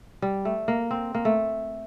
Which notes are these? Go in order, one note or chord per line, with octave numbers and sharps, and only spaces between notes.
G3
A3
A#3
C4
A#3
A3